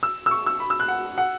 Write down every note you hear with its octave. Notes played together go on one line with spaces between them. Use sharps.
E6
E6
C#6
E6
B5
E6
F#6
F#5
F#5